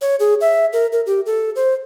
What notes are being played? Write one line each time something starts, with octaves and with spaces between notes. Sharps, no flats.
C#5
G#4
E5
A#4
A#4
G4
A4
C5